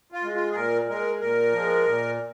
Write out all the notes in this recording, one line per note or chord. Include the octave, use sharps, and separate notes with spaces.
F4
G#3
F4
G#4
A#2 A#4
G#3 A#4
A#2 A#4
F3 G#3
A#2